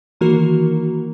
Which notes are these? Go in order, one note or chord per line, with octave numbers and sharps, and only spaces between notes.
D#3 E3 A#3 F#4 A#4